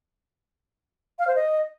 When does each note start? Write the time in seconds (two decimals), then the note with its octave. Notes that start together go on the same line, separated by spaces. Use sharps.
1.19 F5
1.27 C5
1.36 D#5